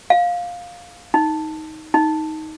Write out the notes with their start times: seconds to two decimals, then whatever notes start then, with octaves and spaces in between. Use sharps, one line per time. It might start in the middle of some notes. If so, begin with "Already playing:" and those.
0.10 F5
1.14 D#4
1.94 D#4